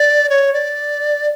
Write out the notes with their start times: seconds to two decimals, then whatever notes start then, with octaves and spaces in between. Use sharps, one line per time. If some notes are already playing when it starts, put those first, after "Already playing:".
Already playing: D5
0.29 C#5
0.53 D5